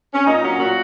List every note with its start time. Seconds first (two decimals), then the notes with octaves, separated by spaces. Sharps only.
0.14 C#4
0.26 A#2 D#4
0.42 F#3 C#4
0.59 A#2 F#4